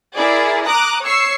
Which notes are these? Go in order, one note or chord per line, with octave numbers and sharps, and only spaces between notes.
E4 G#4 A#4 D5
A#5 D6 D#6 F#6
C#5 C#6 E6 C7 C#7